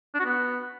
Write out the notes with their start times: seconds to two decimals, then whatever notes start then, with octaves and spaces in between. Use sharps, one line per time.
0.15 D4
0.20 F#4
0.25 B3